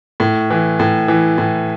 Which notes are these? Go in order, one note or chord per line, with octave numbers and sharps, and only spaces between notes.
A2
E3
A2
E3
A2